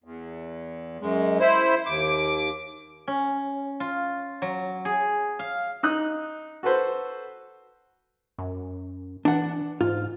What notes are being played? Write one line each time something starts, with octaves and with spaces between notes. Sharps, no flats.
E2
F#2 G#3
E4 C5
D#2 D6
C#4
F4
F#3
G#4
F5
D#4 D#6 F#6
F#4 A4 B4 C5
F#2
E3 D4 F#5
G#2 F4